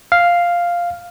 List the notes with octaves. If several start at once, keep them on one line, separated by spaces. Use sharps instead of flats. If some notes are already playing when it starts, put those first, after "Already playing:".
F5